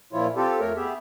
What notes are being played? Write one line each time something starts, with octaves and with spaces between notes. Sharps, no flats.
A#2 F3 E4 F4 C#5
C4 F4 G4 A4
F2 A3 A#4 C#5
B3 G4 G#4 E5